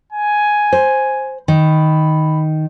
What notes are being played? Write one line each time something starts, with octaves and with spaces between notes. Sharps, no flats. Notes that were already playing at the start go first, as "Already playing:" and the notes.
G#5
C5
D#3 B5